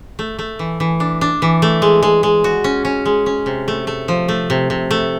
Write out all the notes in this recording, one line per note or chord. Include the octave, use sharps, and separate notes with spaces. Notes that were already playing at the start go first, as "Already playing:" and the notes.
A3
A3
E3
E3
D4
D4
E3
A3
G#3
G#3
G#3
F#4
C#4
C#4
G#3
C#4
C3
A3
A3
F3
A3
C3
C3
A3